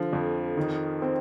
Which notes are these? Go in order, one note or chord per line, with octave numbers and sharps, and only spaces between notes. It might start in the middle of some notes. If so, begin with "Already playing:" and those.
Already playing: D3 F3
F2
D#3
C4